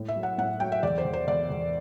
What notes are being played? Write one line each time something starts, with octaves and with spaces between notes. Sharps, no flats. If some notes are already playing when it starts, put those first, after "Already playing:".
Already playing: A2
E5
F#3
F#5
A2 F#5
F#3 G5
E5
E2 D5
C5
E2
C5
E2 D5
E2